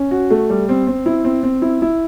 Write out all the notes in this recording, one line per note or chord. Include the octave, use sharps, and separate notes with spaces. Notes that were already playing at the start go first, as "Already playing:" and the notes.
Already playing: C#4
F#4
A3
G3
C4
C4
E4
C4
C4
E4
E4